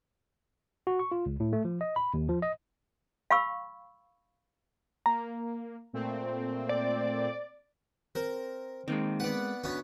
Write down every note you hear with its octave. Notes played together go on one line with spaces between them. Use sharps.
F#4
C#6
F4
C#2
A2
A3
F3
D#5
B5
D#2
F3
D#5
F5 B5 C#6 E6
A#3 A#5
A#2 A3 C4
D5
C4 A#4
D#3 G#3 A#3 C4
B3 B4 D5 F#5
D2 B3 C#4